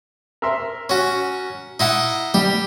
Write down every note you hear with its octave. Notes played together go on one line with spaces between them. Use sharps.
A#4 E5 C6
C#4 F#4
D#4 E4 F#5
G3 G4